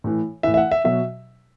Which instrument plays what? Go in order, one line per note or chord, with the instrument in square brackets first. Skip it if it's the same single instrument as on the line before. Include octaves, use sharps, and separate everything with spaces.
[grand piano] A2 E3
A2 E3 E5
E5
F#5
E5
B2 F#3 E5